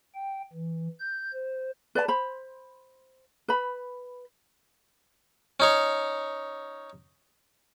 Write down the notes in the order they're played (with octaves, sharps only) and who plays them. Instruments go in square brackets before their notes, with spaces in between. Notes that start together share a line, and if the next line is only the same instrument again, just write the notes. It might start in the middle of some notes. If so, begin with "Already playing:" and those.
[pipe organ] G5
E3
G6
C5
[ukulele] B4 D5 E5 A5
C5 B5
B4 B5
[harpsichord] C#4 D#4 C#5